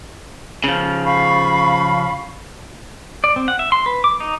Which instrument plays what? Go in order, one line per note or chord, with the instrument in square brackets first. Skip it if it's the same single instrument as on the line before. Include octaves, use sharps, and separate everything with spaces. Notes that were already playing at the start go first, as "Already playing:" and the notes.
[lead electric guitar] C#3 F3
[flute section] F5 B5 C#6
[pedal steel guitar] D5
C4
F#5
E5
C6
B4
D6
D#4